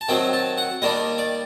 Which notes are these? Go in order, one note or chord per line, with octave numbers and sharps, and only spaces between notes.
A5
C3 D#3 F#3 C4 G5
A5
F#5
D#2 D#3 G3 D4 D#5
D5